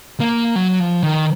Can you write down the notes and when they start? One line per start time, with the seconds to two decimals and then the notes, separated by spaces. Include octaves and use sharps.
0.20 A#3
0.56 F#3
0.80 F3
1.03 D#3